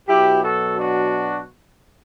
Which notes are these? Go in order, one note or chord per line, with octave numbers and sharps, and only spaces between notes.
B2 F#3 E4 G4
F#4 A4
D4 F#4